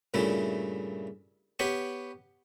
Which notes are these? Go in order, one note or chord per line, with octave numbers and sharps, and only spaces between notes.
G2 A#2 C#3 A3 E4
B3 G4 C#5 B5 C#6